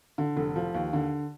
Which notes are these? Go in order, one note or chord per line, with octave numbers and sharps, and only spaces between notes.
D3
F1
F3
D#2
D3